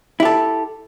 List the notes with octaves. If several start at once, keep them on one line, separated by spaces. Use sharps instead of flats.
E4 G4 A4